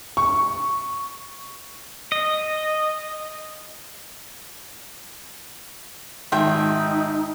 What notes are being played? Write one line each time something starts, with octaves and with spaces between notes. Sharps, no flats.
C#6
D#5
G#1 D#4 E5 G5 C6